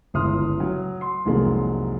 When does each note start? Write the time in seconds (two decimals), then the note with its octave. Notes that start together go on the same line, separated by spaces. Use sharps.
0.14 G1 C#2 E4 C6 D#6 F6
0.60 F#3
1.01 C6
1.25 C2 F2 D#3 F#3 G#3 A#3